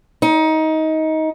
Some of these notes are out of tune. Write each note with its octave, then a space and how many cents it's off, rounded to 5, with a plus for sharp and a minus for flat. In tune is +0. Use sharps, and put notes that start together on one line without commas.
D#4 +20